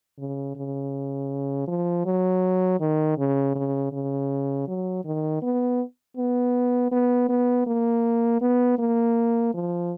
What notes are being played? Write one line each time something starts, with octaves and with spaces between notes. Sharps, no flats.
C#3
C#3
F3
F#3
D#3
C#3
C#3
C#3
F#3
D#3
B3
B3
B3
B3
A#3
B3
A#3
F3